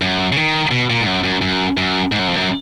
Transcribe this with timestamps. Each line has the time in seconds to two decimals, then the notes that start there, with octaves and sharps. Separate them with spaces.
0.02 F#2
0.32 C#3
0.36 D#3
0.71 B2
0.90 A#2
1.02 G#2
1.07 F#2
1.24 F#2
1.41 F#2
1.77 F#2
2.12 G#2
2.19 F#2
2.27 F2
2.36 F#2